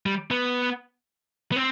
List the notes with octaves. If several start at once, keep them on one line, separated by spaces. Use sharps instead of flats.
G3
B3
B3
C4